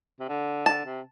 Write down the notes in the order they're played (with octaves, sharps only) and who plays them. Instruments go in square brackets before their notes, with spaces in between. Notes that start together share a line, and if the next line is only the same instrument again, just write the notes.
[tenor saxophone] C3
D3
[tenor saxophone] D3 [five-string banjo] A5
[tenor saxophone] C3